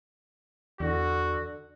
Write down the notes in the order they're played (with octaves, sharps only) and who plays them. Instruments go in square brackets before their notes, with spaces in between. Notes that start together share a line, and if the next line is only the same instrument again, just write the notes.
[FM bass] E2 [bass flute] D3 [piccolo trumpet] F#4